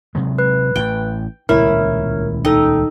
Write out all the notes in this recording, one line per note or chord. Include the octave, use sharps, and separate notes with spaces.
C3 F#3 G#3
B4
A1 A2 G5
D#1 C#2 B2 E4 A#4 C#5
D#4 A4 G5